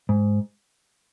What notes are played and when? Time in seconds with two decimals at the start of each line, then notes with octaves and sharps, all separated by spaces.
0.09 G#2